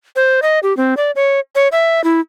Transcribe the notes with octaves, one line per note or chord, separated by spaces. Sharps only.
C5
D#5
G4
C4
D5
C#5
C#5
E5
E4